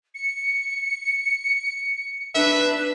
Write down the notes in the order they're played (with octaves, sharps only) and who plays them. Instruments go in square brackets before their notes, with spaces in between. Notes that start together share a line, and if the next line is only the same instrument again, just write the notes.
[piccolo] C#7
[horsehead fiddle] D4 B4 [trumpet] E5